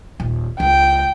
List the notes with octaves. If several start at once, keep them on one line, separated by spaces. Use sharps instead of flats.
D#1
C#2 G5